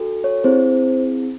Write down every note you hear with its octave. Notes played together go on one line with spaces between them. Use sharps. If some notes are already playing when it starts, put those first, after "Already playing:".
Already playing: D4 F#4 A4
C#5
C4 E4 G#4 C5